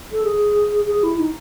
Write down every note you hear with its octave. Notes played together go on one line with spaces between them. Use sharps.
A4
G#4
G#4
E4
D#4